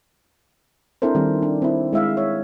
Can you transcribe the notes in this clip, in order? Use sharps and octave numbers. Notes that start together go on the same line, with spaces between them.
C4 D4 E4 A4 A#4 C5
D#3 G3 C4
D4
C4 E4
G#3 E4 E5 F5
C#5 E5